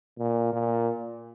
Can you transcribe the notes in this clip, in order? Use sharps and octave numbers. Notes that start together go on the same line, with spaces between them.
A#2
A#2